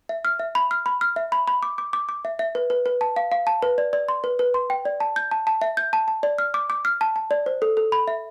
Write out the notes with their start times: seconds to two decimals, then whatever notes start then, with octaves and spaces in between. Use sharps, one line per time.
0.09 E5
0.25 F6
0.39 E5
0.55 B5
0.71 F6
0.86 B5
1.01 F6
1.16 E5
1.32 B5
1.48 B5
1.63 D6
1.78 D6
1.93 D6
2.09 D6
2.25 E5
2.39 E5
2.55 B4
2.70 B4
2.86 B4
3.01 A5
3.16 F5
3.32 F5
3.47 A5
3.63 B4
3.78 D5
3.93 D5
4.09 C6
4.24 B4
4.39 B4
4.54 C6
4.70 G5
4.85 D5
5.00 A5
5.16 G6
5.31 A5
5.47 A5
5.62 E5
5.77 G6
5.93 A5
6.08 A5
6.23 D5
6.38 F6
6.54 D6
6.70 D6
6.85 F6
7.01 A5
7.16 A5
7.31 D5
7.46 C5
7.62 A4
7.77 A4
7.92 B5
8.08 E5